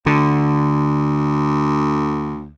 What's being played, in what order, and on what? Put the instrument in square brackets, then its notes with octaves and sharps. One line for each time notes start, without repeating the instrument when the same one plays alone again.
[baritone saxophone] D2 [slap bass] D3